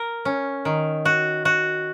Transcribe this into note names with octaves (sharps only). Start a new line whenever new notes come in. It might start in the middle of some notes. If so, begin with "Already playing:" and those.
Already playing: A#4
C#4
D#3
F#4
F#4